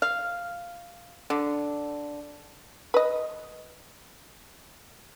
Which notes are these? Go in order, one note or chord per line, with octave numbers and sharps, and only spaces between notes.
F5
D3
B4 D#5